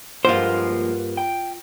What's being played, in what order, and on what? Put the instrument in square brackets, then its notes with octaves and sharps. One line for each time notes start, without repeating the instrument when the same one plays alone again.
[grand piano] G2 A#3 F#5 [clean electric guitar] A#2 F3 G#3 [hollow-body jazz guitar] F4 C5
[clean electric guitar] G5